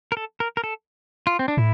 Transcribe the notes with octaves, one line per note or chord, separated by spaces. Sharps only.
A#4
A4
A#4
A#4
A4
F4
C4
D4
A2 E4